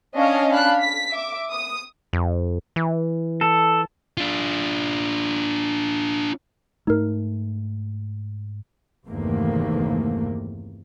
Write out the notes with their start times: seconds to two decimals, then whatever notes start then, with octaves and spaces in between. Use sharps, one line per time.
0.14 C#4 D4 C#5 D#5 F5
0.50 D4 F5 B5 F#6
0.81 B6
1.10 E5 D6
1.51 D#6
2.13 F2
2.76 E3
3.41 A4
4.18 D4 F4
6.87 G#2 A3 D#4 A#4
9.07 G1 E2 C3 D#3 A3 A#3